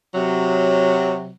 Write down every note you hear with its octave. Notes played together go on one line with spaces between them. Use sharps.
C3 F#3